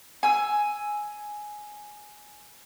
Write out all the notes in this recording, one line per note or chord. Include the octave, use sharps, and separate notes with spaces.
G#5 E6